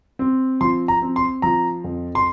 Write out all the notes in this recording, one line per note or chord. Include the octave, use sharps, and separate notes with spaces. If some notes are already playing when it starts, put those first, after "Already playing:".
C4
F3 C6
A#5
C4
C6
F3 A#5
F2
C6